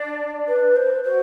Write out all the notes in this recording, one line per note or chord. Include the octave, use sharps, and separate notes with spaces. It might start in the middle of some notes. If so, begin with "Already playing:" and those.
Already playing: D4 D5
B4
C5
F#4 C5